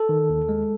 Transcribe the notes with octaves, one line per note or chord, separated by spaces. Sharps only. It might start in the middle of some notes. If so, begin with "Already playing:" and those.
Already playing: A4
D#3
D#2
G#3